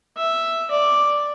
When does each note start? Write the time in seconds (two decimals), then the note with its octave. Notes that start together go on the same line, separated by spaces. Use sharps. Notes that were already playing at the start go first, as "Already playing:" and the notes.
0.17 E5
0.71 D5